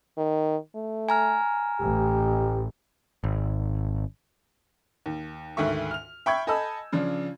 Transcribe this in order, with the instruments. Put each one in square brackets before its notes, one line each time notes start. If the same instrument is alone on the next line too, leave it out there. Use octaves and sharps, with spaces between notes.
[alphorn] D#3
A3
[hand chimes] G#5 A#5 F6
[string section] A1 [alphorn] G4
[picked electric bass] G#1
[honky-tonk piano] D#2
D2 G#2 D#3 A3 E5 C#6
F6 F7
E5 G5 B5 C#6 G6 G#6
A4 D#5 G#5 A5 B5 E6
C#3 F3 D4